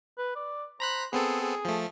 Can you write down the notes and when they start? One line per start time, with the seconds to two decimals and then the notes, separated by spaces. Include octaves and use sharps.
0.18 B4
0.36 D5
0.80 C5 A#5 B5 F#6
1.13 B3 C4 G#4 A4
1.41 G#4
1.65 F3 A3